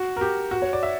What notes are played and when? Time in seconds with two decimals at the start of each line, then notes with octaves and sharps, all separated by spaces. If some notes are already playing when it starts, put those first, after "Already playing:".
Already playing: F#4
0.17 A#4
0.21 G4
0.51 F#4
0.62 C#5
0.73 D5
0.83 E5